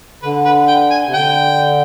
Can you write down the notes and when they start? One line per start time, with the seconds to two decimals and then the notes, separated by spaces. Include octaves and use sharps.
0.23 D3 B4
0.45 B4
0.68 G5
0.90 G#5
1.06 C3
1.13 D3 G5